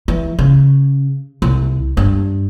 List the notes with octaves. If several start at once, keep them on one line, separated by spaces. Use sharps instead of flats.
E3
C#3
C2
G2